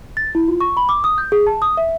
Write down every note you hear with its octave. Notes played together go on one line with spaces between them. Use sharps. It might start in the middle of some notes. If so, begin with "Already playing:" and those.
A6
E4
F4
C#6
B5
D6
D#6
G6
G#4
A5
D#6
E5